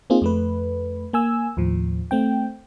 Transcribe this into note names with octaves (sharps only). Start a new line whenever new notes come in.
A#3 C4 D#4 F4 G#4
F2 A3 B4
A#3 G#5 E6
D#2 A2 F3
A3 C4 G5